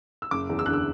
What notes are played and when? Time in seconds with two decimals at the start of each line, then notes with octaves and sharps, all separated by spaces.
0.22 E6
0.31 F#1 D6
0.49 E2
0.59 E6
0.66 D3 F#6
0.73 E6